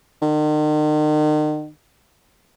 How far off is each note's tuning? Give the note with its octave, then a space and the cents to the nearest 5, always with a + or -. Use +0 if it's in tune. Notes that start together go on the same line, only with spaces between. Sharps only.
D#3 -40